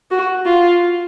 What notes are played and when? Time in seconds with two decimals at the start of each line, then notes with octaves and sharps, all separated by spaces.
0.11 F#4
0.46 F4